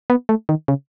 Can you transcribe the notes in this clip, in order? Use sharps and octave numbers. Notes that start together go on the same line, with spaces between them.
B3
A3
D#3
C#3